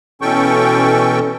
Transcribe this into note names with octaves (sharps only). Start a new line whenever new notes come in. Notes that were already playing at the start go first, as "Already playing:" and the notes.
B2 E3 C#4 A4 G5 C#6